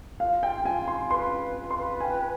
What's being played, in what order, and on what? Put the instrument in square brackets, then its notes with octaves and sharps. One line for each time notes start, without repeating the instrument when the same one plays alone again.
[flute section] F4 [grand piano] F5
[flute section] F4 [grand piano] G5
[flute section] F4 [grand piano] G#5
[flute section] F4 [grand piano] C6
[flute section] B4 [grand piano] C6
[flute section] F4
F4
[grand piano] C6
[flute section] B4
[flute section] G5 [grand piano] G#5